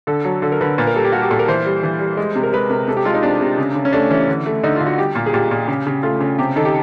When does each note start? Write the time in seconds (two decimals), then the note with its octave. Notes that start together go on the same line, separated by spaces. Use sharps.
0.07 D3 A4
0.25 F#3
0.42 D3 A4
0.52 A#4
0.61 D3 B4
0.78 A#2 B4
0.87 A#4
0.95 G3 A4
1.04 G4
1.12 G3 F#4
1.22 G4
1.30 A#2 A4
1.39 A#4
1.48 E3 C5
1.66 G3
1.83 E3
2.00 G3
2.17 G#3
2.35 C3
2.43 A#4
2.53 G#3 B4
2.70 C3 A#4
2.88 C3 A4
2.97 G4
3.05 G#3 F4
3.14 D#4
3.23 C3 D4
3.41 C3
3.58 C#3
3.75 C#3
3.85 C#4
3.93 A3 D4
4.10 E3 C#4
4.28 D3
4.46 A3
4.64 D3 D#4
4.76 D3 F4
4.87 F#4
4.98 G3 G4
5.15 A#2
5.26 G#4
5.33 A#2 G4
5.51 A#2
5.68 C#3
5.87 C#3
6.03 A3 F4
6.20 C#3
6.38 C3 G4
6.56 D#3 A4
6.65 G4